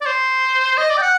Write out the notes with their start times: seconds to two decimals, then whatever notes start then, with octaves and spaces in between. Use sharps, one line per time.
0.01 D5
0.06 C5
0.78 D#5
0.90 D5
0.98 G5
1.02 F#5